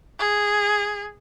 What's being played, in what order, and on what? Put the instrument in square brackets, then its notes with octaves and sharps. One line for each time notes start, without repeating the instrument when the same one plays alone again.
[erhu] G#4